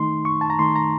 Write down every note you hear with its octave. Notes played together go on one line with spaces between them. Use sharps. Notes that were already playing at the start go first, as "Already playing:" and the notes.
Already playing: D#3 A3 D#4 C6
C#6
A5
A#5
D#3 A3 D#4 C6
A#5